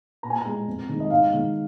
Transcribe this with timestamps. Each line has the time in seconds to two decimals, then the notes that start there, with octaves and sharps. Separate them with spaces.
0.23 A#2 A#5
0.30 G#5
0.38 A#5
0.46 G#3
0.67 F2
0.89 D#3 G#3
1.00 D#5
1.10 G#2 F5
1.32 D#3 G#3